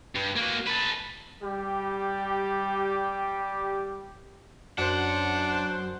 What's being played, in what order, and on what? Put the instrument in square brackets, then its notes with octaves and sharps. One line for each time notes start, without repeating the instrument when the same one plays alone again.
[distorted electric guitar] G2
A#3 F#4
A4 B4
[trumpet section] G3 G4
[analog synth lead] F#2 [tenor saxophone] D4 [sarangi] C5 [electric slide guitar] F#5